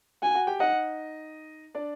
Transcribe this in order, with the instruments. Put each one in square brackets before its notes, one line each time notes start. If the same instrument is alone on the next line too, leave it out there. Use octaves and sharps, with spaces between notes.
[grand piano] F#4 F#5 [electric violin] G#5
[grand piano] F#4 F#5
G4 G5
[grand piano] D#4 D#5 [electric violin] F#5
[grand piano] D4 D5